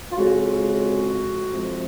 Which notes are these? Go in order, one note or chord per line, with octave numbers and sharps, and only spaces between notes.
F4
F2 C#3 G#3 F#4
F2 C3 F3 G#3